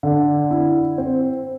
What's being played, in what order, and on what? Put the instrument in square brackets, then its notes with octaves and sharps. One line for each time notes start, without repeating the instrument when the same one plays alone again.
[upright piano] D3
E4
C4